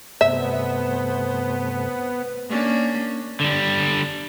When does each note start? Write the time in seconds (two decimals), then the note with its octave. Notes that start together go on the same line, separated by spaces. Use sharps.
0.21 G2 C3 A3 B3 C5 E5
2.49 A#3 C#4 D4
3.41 D3 G3